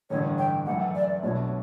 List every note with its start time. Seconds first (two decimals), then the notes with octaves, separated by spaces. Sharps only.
0.10 A1 G2 D3 C#5
0.38 G5
0.66 F#2 E3 A3 E4 F#5
0.95 D5
1.23 B1 B2 A3 D4 F#4 C#5